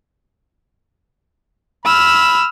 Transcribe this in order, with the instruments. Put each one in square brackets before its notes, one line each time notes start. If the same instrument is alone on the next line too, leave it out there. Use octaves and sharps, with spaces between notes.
[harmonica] B5 [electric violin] E6 F6